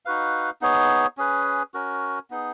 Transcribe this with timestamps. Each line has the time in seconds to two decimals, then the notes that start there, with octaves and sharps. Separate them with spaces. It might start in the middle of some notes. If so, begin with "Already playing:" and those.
0.05 D#4 F#4 B4 F5
0.61 B3 D#4 G#4 C#5
1.17 C#4 G#4 B4
1.74 C#4 F#4 A#4
2.30 B3 D#4 G#4